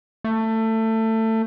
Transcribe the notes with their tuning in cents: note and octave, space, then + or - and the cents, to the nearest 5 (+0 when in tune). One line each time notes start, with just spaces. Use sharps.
A3 +20